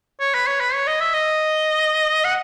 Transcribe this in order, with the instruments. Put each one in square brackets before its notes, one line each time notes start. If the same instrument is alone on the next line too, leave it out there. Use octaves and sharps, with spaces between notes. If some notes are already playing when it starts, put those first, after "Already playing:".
[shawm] C#5
B4
C#5
B4
C#5
D#5
E5
D#5
F#5